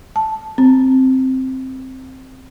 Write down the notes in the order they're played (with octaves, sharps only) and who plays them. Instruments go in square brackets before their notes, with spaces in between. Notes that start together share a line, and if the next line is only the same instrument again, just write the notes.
[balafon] A5
C4